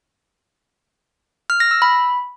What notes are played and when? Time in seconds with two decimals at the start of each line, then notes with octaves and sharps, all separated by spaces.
1.50 F6
1.60 A#6
1.71 E6
1.82 B5